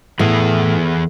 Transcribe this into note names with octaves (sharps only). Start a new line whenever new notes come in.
A2 E3 B3 G#4